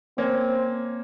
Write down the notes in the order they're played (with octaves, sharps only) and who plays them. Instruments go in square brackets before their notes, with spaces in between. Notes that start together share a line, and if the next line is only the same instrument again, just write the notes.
[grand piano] A#3 C#4 [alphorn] C4